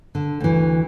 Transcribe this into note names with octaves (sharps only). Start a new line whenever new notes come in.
D3
D2 E3